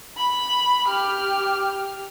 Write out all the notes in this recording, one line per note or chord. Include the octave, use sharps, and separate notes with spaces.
B5
G4 F6